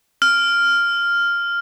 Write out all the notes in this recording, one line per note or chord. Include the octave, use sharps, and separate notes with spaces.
F6